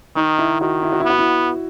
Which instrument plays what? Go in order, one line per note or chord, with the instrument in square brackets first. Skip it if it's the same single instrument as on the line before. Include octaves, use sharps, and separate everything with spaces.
[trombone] D#3 [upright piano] D#4
[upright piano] E4
[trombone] D#3 [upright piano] F#4
[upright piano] E4
F#4
E4
[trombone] B3
[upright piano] F#4
E4